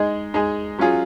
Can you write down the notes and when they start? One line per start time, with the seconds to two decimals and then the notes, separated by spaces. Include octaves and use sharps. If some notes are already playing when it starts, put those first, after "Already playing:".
Already playing: G#3 D#4 G#4
0.34 G#3 D#4 G#4
0.79 F#3 C#4 F4 G#4